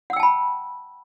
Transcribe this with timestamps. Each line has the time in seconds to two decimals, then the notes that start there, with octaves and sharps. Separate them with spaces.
0.10 F#5
0.13 E6
0.16 G5
0.20 A5
0.23 B5